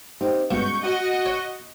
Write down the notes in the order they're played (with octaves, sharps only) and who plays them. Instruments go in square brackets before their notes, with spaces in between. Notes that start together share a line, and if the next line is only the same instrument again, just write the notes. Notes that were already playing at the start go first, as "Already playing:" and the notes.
[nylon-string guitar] C4 D#4 G4
[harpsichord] G2 B2 [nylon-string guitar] G#3 C#4 F#4 [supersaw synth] C#6 G6
[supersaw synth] F#4 [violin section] D#5 [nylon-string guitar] F#5
[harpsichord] C#5